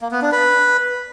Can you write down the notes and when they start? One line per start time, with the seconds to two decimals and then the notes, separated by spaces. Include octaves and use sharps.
0.01 A#3
0.12 B3
0.22 D4
0.32 B4